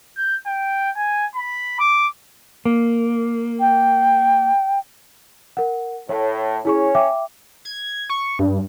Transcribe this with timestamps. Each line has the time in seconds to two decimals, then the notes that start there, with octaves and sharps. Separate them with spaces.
0.17 G6
0.46 G5
0.96 G#5
1.36 B5
1.80 D6
2.65 A#3
3.60 G5
5.57 A#4 F#5
6.09 A2 C#5
6.65 C#4 E4 G#4 C#6
6.95 E5 G5 D6
7.65 G#6
8.10 C#6
8.39 G2